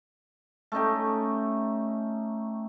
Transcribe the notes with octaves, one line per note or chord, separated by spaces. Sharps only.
A3 C#4 D#4 G4